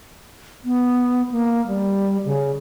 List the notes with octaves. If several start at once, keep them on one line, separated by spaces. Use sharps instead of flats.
B3
A#3
G3
C#3